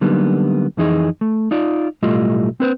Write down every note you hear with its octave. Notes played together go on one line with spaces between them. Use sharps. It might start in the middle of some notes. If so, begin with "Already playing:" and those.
D3 F#3 G3 A#3 B3 D#4
F2 E3 D#4 G#4 D#5
A3
D#4 F4 D5
B1 A2 G3 A3 F4 D#5
C4 B4 C5